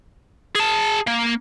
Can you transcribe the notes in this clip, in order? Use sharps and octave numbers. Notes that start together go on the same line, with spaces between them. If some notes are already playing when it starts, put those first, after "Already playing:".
G#4 A5
A#3